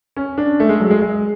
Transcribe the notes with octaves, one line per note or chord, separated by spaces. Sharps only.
C#4
D4
A3
G#3
F#3
G#3
G#3